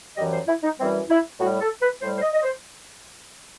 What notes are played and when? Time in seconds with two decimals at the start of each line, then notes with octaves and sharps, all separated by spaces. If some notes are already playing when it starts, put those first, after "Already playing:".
0.17 F#2 E3 G3 D#5
0.33 C5
0.47 E4
0.63 D#4
0.78 F#2 E3 G3 C4
1.09 E4
1.40 A2 G3 F#4
1.60 A4
1.81 B4
2.01 A2 G3 C5
2.16 C5
2.22 D#5
2.33 D#5
2.42 C5